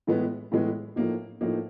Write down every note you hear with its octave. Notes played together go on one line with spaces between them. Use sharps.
A2 E3 G#3 B3
A2 E3 G#3 B3
A2 F3 A#3 D#4
A2 F3 A#3 D#4